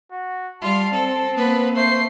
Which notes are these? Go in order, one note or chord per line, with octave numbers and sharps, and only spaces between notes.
F#4
G3 F4 F5 A5
C4 A4
A#3 B3 B4
A3 C5 C7